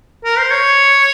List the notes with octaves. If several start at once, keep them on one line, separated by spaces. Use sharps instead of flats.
A#4
C5
C#5